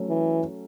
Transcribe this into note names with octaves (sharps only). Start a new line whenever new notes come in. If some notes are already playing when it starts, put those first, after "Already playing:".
Already playing: F#3 A3 C#4
E3